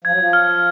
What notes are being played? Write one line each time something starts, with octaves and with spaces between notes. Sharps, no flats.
F3 G#6
F#3
F3
F6